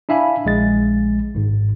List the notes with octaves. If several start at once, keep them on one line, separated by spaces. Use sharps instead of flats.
D4 E4 E5 F5 G#5 B5
A#1 G#3 A6
G#1 G#2